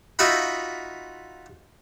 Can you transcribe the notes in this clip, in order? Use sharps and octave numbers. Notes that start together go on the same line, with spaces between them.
D#4 F4 F#4 E5 F#5 B5